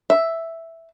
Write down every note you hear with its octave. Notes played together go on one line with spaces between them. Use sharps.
E5